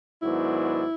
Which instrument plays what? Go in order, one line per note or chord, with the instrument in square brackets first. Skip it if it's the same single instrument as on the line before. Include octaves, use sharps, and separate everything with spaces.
[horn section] G#2 D#3 F#3 B3 D4 [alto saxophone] E4